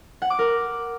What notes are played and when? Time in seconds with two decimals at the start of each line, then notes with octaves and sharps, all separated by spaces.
0.22 F#5
0.30 D6
0.39 A#4